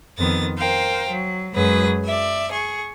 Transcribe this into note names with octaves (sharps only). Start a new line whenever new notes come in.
F2 D#3 B3 A6 A#6
A#4 C5 F5 G5
F#3
F#2 F#3 G#3 G#4 B4 A#6
D5 E5
G#4 C#6